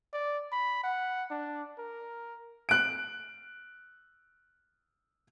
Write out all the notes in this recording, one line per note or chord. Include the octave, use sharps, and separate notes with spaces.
D5
B5
F#5
D4
A#4
F#6 D7